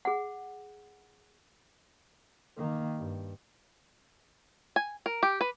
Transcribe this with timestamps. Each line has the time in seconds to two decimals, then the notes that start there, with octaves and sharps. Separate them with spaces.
0.05 G#4 F#5
2.57 D#3 A#3
2.98 G2
4.76 G#5
5.06 A#4
5.23 G4
5.41 B4